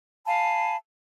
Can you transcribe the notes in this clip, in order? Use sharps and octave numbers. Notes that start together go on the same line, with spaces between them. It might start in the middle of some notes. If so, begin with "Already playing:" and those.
F5 G#5 A5 B5